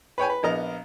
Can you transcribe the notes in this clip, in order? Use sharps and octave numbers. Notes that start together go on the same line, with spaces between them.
B4 C#5 G5 G#5
B4
A#1 B3 A#4 D#5 A#5